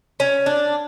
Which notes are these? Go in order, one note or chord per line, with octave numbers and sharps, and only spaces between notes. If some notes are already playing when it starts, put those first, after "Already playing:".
C#4
D4